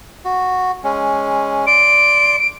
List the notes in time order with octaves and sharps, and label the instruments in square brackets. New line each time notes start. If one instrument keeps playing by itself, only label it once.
[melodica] F#4
G#3 C#4
[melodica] D5 C6 [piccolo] D7